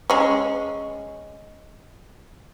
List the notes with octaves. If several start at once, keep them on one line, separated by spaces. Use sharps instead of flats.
G#3 C#4